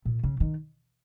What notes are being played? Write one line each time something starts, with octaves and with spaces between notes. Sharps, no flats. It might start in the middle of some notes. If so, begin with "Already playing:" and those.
A#2
C#3
D#3